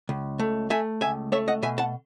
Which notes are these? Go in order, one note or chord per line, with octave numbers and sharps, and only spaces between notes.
C#2
A3
A3 E5 G#5
C#2 E5 G#5
A3 C#5 E5
D#5 F#5
B2 E5 G#5
F#5 A5